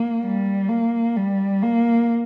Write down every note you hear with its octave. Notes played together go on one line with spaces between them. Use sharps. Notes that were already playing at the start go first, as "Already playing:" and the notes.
Already playing: A#3
G3
A#3
G3
A#3